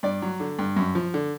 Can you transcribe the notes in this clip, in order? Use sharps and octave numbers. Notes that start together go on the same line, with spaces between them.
G2 D5
F#3
D3
G2
F#2
F3
D3